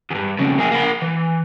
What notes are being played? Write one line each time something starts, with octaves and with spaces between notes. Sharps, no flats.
E2 G2
F2 C#3
A#3 G#4
A#3 B5
E3